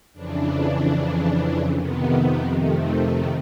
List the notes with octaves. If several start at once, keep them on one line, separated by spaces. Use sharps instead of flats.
F2 C#3 E3 D4
F2 C3 D#3 B3
A3